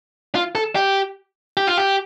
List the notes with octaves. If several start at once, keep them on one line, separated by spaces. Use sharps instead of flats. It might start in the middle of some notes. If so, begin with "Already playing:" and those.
F4
A4
G4
G4
F4
G4